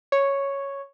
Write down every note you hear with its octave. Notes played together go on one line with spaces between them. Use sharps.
C#5